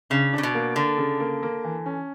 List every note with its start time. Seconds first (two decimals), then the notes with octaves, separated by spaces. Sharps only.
0.10 C#3 D4
0.33 C#3 D4
0.43 B2
0.55 A#3
0.76 D3 D4
0.98 C#3
1.20 A#3
1.43 A#3
1.64 E3
1.86 C#4